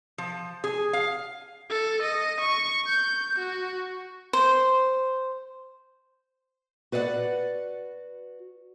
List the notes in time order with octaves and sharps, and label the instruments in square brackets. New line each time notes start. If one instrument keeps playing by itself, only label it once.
[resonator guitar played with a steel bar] F3
G#4
F5
[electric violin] A4
D#5
C#6
G6
F#4
[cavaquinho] C5
[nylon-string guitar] F#4 B4 D5 D#5 F#5